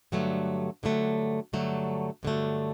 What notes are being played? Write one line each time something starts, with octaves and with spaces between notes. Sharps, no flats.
G2 D3 F#3 A3
G2 D3 F#3 A3
G2 D3 F#3 A3
G2 D3 F#3 A3